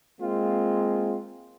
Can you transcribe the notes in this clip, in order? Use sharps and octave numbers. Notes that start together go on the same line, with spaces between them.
G#3 A#3 C4 F4